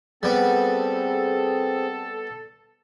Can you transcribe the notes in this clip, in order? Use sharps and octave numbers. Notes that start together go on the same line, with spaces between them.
G3 B3 C4 G#4 A4